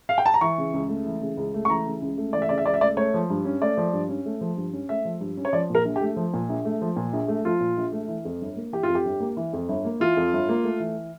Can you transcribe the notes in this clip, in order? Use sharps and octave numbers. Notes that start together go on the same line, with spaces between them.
F5
G5
A5
A#5
E3 C#6
C#3
C#2
A3
E3
C#3
C#2
A3
C#6
E3 A#5
C#3
C#2
A3
E3 D5
E5
C#3 D5
E5
C#2 D5
E5
A3 D5
A3 C#5
F3
G2
C#4
A3 D5
F3
G2
C#4
A3
F3
G2
C#4
A3 E5
F3
G2
C#4
C#5
F3 D5
A#2 A#4
A#1
G4
A3
F3
A#2
A#1
A3
F3
A#2
A#1
A3
F3 F4
A#2
A#1
A3
E3
F2
G1
A#3
E3 G4
F4
F2
G4
G1
A#3
E3
F2
G1
A#3
E3 F4
F2
G1
A#3
A3
E3